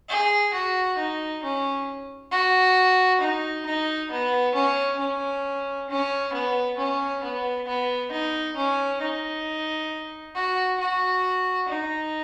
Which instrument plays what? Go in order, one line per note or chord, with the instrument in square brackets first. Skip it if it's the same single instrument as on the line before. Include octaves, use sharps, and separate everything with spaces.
[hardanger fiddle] G#4
F#4
D#4
C#4
F#4
D#4
D#4
B3
C#4
C#4
C#4
B3
C#4
B3
B3
D#4
C#4
D#4
F#4
F#4
D#4